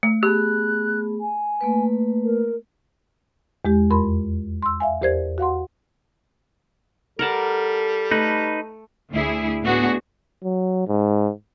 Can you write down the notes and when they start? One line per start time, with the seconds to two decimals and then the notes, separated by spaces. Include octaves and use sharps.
0.03 A3
0.23 A3 B3 G4 G#4 F#6
1.21 G#5
1.61 A3 A#3 B4
2.24 A#4
3.65 E2 G#3 G4
3.90 F2 A#4 B5 C6
4.62 C6 E6
4.80 E5 F5 G#5
5.01 E2 G4 A#4 C5 D5 G#6
5.38 F#4 F5 F#5 C6
7.19 G3 A4 A#4 F#5 A5
8.11 A3 D#4 B4
9.11 D2 E4 G#4
9.63 A2 B3 D4 F#4 G#4
10.43 F#3
10.88 G#2